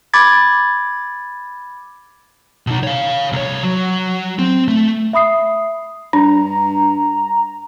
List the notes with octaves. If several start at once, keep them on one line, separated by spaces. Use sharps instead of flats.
B5 D6 G#6 A6
B2 D#4
C#5 F5
C2 C#5
F#3
C4
A3
E5 B5 D#6 C7
G2 D4 A#5